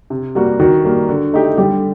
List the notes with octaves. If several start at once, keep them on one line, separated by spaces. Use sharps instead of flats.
C3
G3 A#3 F#4
D#3 F#4
G3 A#3
D3
A3 D#4 G4
D3 G3 G4